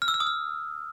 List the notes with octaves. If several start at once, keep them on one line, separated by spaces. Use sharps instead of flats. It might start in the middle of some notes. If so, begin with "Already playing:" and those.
F6
E6
F6
D#6
F6